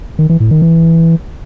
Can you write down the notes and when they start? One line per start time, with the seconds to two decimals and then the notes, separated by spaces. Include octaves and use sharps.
0.19 D#3
0.30 E3
0.40 A2
0.51 D#3
0.62 E3